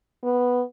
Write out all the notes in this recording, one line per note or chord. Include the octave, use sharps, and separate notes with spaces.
B3